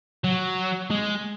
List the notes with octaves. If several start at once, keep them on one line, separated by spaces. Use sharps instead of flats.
F#3
G#3